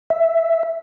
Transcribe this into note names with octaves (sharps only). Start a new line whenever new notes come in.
E5